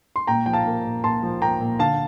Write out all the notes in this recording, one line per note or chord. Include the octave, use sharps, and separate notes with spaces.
C6
A#2 G5 A#5
F3 G5
F5 A5
A#3
A#2
A#2 A5 C6
F3
A#3 G5 A#5
A#2
D3 F5 A5